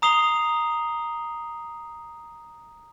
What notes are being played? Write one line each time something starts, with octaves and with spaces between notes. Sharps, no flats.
A#5 D#6 C7 F7 G7